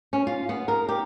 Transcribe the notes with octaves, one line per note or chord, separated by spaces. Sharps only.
C#4
F4
B3
A#4
G4